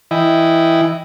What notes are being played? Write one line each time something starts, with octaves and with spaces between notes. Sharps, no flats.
E3 E4 D#5 G5 G#5